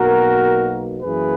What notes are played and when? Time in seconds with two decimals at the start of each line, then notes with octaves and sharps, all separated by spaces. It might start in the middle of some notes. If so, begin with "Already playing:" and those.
Already playing: B1 B2 A#3 F#4 A#4
1.02 F#2 E3 A#3 G#4 B4